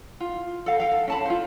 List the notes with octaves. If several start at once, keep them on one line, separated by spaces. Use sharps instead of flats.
F4
A4 F5
F5 G5
A4
C#4 A5 B5
F4 C5